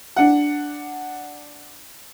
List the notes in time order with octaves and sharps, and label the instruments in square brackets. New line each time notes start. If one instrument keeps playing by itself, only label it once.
[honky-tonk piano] D4 F#5